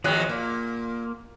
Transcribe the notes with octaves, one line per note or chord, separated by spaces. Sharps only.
D#2 G#2 F3 F#3 G#4 F#6
A#2 A#3